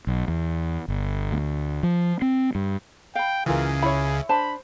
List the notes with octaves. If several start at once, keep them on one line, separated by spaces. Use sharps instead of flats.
B1
E2
G1
D2
F3
C4
G2
F5 G5 B5
C#2 C#3 E3 F4 G#4 A#4
E4 C#5 B5
D4 C5 A5 B5